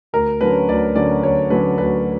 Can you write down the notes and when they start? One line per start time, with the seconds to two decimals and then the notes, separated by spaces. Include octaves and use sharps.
0.13 D2 A#4
0.41 D3 F#3 C#4 B4
0.69 D2 D5
0.96 D3 F#3 C#4 D5
1.23 D2 C#5
1.50 D3 F#3 C#4 B4
1.78 D2 B4